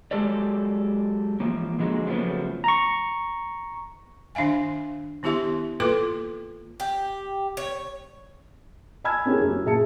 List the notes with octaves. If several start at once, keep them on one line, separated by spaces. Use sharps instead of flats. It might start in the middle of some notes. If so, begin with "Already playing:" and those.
F#3 G#3 G4 A4 C#5 D5
E3 F3 A#3
D3 F3 G#3 A#3 F#4
C#3 F3 F#3 A3 B3 C4
A#5 C#6
D#3 D4 E5 F5 G#5
D#3 B3 E4 G4 E5 C6
A#3 F4 A4 B4 C6 D6
G4
C#5
G#5 A5 B5 E6 F6 G#6
C4 C#4 E4 G4 G#4 A#4
F#2
A#2 G#4 E5 A5 C#7